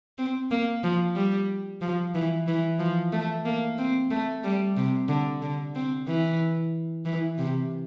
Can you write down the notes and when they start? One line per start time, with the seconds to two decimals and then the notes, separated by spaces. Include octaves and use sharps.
0.18 C4
0.51 A#3
0.84 F3
1.16 G3
1.81 F3
2.15 E3
2.48 E3
2.79 F3
3.13 A3
3.45 A#3
3.78 C4
4.10 A3
4.44 G3
4.77 C3
5.08 D3
5.42 D3
5.75 C4
6.07 E3
7.05 E3
7.38 C3